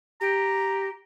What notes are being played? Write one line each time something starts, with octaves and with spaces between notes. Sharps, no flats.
G4 A#5